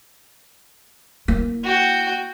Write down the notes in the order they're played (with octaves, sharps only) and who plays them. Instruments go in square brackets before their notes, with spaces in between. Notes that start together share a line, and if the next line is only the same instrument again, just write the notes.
[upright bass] A#3 E4
[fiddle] F#4 G5